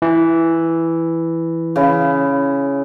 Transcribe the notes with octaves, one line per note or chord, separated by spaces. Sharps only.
E3
C#3 E4